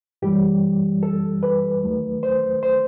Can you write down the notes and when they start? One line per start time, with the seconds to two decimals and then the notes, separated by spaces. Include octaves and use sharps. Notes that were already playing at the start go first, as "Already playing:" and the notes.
0.22 F#2 E3 G3 G4
1.03 A4
1.43 B4
1.82 D#2 D#3 F#3 A3
2.23 C5
2.63 C5